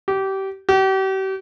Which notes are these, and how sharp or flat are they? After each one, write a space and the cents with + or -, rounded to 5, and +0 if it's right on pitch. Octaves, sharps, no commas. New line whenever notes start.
G4 -25
G4 -40